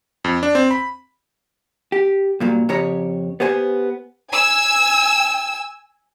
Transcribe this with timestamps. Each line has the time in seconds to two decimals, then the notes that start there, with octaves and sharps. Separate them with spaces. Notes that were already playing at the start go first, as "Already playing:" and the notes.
0.24 F2
0.43 D4
0.55 C4
0.71 B5
1.92 G4
2.40 G2 A#2 F#3
2.69 F2 C#3 G4 C#5 A#5
3.40 B3 G4 C5 G#5
4.31 G#5 E6